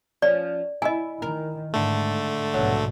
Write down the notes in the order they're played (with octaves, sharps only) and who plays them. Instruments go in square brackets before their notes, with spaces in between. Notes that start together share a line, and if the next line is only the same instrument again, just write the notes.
[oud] F3 C#4 [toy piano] D5
[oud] E4 [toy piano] D#5 G#5
[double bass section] D#3 [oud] A#4
[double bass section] G#2 [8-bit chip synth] D3 A3
[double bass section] A#1 G#2 B2 [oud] F#3